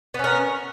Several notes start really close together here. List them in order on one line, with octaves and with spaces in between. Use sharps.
B3 C#4 A#4